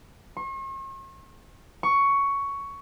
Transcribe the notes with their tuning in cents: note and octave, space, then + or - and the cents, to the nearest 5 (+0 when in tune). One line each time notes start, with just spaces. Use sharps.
C#6 -45
C#6 +10